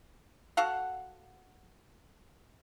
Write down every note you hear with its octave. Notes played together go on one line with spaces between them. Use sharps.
F#4 A4 F5 F#5